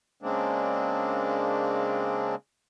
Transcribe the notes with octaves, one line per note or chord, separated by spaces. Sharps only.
C#3 G#3 A#3 C4 D4